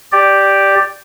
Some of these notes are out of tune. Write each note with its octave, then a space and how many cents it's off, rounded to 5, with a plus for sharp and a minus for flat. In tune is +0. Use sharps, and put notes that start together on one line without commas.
G4 +0 D5 +0